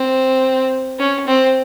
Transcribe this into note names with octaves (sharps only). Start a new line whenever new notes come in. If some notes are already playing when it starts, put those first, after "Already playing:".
Already playing: C4
C#4
C4